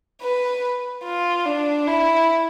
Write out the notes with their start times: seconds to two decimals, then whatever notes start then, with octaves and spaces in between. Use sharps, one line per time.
0.22 B4
1.04 F4
1.45 D4
1.87 E4